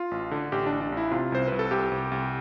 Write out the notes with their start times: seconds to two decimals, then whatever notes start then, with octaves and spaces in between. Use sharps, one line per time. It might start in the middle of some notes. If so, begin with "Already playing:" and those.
Already playing: F4
0.11 A1
0.31 D3
0.52 A1 G4
0.66 D4
0.72 A1
0.81 D4
0.92 A1
0.97 E4
1.11 C3 F4
1.32 C2 C5
1.48 C2 B4
1.59 A4
1.71 C2 G4
1.92 C2
2.12 C2